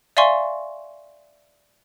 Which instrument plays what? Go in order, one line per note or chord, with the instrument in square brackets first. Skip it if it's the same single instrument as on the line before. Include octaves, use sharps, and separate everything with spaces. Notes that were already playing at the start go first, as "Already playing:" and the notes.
[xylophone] D5 E5 F5 G#5 C6 C#6